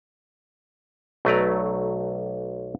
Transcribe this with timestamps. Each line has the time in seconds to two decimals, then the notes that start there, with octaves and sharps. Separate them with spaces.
1.25 B1 F#3 A3 B4 D5 A#5